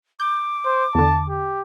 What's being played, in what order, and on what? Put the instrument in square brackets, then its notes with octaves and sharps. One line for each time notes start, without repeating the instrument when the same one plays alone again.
[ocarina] D6 [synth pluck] G6
[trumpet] C5
[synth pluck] E2 D3 [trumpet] A5
[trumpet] G4